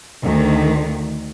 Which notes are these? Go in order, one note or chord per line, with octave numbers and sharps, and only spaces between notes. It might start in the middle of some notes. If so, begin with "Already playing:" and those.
D2 D#3